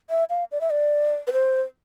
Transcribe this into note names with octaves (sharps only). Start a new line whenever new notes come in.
E5
F5
D5
E5
D5
B4
C5